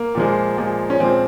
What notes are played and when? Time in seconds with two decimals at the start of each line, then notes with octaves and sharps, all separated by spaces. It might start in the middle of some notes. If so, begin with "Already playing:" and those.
Already playing: A#3
0.15 A#2 F3 G#3
0.57 A#2 F3 G#3
0.90 C#4
0.99 A#2 F3 G#3 C4